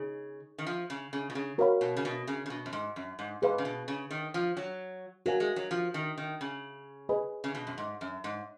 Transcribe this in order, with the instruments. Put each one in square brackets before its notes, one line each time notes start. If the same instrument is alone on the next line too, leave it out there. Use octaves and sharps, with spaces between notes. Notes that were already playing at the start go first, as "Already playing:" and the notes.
Already playing: [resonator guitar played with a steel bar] C#3 [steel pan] D#4 G#4
[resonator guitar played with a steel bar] D#3
F3
C#3
C#3
B2
C#3
[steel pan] F#4 A#4 C#5 F5 B5
[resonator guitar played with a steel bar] B2
C#3
B2
C#3
C#3
B2
F#2
G#2
F#2
G#2
[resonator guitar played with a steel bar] G#2 [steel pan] G#4 B4 F5 B5
[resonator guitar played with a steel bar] C#3
B2
C#3
D#3
F3
F#3
[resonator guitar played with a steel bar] F#3 [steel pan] F#4 A#4 F5 G#5
[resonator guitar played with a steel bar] G#3
F#3
F3
D#3
D#3
C#3
[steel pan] G#4 B4 D#5 G#5 B5
[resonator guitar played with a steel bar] C#3
B2
F#2
G#2
F#2
G#2